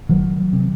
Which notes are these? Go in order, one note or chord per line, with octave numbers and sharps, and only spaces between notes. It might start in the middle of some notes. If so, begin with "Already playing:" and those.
F#1 D#3 F#3
C3